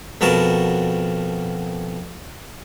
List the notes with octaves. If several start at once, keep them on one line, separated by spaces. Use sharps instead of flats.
F2 B2 F#4 A#4 A5